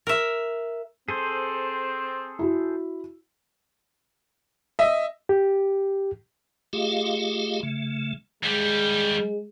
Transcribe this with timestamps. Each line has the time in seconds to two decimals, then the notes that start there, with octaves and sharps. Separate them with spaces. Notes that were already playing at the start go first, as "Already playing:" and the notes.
0.07 A#4 E5
1.08 C4 G#4 A4 C5
2.39 E4 F#4
4.79 D#5 E5
5.29 G4
6.73 A3 F4 G4 G#4 D#5 F5
7.63 C#3 A3
8.43 D#2 G3 G#3